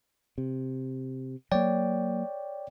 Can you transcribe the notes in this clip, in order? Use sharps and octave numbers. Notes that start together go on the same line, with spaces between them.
C3
F#3 A#3 C#5 D5 G5